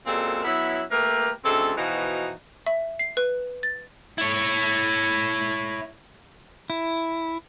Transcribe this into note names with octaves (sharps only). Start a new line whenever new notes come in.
F#2 A#2 G#3 C4 A4 A#4
F#3 B3 C#4 E4
A3 A#3 G4 A#4 B4
D2 C#3 G#3 C4 A4
B2 E3 F3 D#4 F#4
E5
C7
B4
A6
E4 C#5
E4